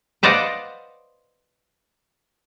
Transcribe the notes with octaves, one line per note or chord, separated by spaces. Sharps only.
B4 C5 D5 D#5 F5 F#5